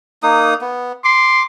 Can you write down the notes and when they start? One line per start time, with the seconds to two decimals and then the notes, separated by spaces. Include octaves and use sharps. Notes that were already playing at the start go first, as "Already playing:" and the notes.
0.23 A#3 D#4 D#6
0.61 B3
1.04 C6 D6